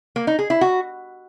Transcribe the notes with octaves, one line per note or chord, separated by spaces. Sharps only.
A#3
D#4
G#4
E4
F#4